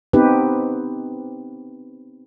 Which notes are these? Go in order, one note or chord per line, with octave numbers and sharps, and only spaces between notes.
B3 C4 D#4 G4 B4